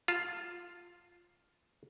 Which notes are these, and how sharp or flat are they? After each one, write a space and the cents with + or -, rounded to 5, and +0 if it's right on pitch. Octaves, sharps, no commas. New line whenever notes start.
F4 +0 A5 +30